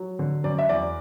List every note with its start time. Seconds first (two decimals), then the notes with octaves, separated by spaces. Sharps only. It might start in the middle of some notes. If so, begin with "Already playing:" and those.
Already playing: F#3
0.19 D3
0.44 F#2 D5
0.59 E5
0.69 E2 D5